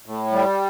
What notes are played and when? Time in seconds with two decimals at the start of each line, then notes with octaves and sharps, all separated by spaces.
0.06 A2
0.32 G3